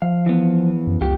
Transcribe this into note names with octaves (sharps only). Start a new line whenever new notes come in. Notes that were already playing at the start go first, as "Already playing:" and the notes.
F3 F5
E3 B3
F#2
C#2 F4 G4